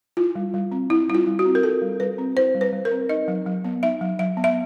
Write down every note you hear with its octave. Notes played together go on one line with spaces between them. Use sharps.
E4 F4
G3
G3
C4
E4
G3 E4
F4
G3
F#4
C4
A#4
E4 A4
G3
G3 B4
C4
E4 C5
G3
B4
G3
A#4
C4
D#4 D#5
F#3
F#3
B3
D#4 E5
F#3
F#3 E5
B3
E5